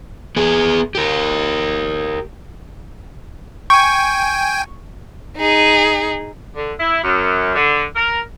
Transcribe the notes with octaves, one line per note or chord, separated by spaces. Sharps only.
B3 G#4
G4 A#4
G5 G#5 C#6
D#4 G#4
D3
E4
F#2
D3
A#4